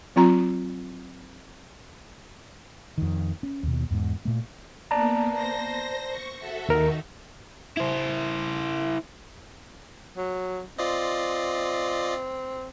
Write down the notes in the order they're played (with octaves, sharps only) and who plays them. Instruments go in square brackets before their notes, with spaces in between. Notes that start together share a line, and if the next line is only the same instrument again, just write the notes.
[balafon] F#3 C4 F4 A#5
[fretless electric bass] F2 D#3
C#4
D#2 B2
E2 G#2
A#2 A3
[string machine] A#3 B3 [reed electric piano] D5 A5 A#5
[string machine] C5 A#6
C#6
F#4 A4 E5
[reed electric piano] D#2 A#4 [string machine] D#3 D#4
[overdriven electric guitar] E4 C5
[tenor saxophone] F#3
[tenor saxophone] C4 [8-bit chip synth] F4 D5 D#5